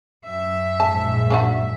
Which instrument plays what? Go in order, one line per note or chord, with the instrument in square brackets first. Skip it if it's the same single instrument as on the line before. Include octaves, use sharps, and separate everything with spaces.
[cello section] F#2 E5
[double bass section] A#1 G#2 [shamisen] A5
[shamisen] A#3 D4 F#4